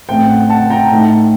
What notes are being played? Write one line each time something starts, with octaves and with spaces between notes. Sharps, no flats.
A1 A2 A3 C4 G5
F#5
F#5 A5
G5 A#5
A2 A3 D#4